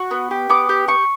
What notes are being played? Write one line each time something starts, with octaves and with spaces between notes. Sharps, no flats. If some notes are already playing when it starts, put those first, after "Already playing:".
Already playing: F#4 C#6
B3
G4
B3 D6
G4
G4 C#6